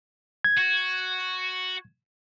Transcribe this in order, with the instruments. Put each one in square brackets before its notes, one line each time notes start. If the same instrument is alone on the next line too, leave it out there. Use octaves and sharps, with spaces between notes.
[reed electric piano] G#6
[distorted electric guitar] F#4